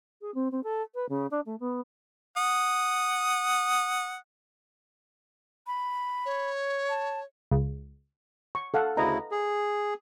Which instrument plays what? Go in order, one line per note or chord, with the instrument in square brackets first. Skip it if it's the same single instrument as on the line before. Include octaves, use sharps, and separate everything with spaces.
[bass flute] G#4
C4
C4
A4
B4
C#3
D4
A3
B3
[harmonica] F#5 D#6
[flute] B5
[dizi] C#5
[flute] A5
[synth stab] C#2
[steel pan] C#6
A4 F5 F#5
[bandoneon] D2 C#3 E4 [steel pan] B4 D#5 A#5
[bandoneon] G#4